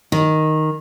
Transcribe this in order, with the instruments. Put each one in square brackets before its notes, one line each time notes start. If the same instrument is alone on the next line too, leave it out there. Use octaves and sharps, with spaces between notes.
[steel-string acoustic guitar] D#3